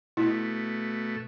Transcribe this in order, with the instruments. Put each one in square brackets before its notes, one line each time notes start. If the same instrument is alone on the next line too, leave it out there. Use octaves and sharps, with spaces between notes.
[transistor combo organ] B2 A3 [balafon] E4